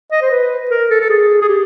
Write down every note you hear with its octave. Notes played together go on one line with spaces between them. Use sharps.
D#5
C5
B4
A#4
A4
A4
G#4
G#4
G4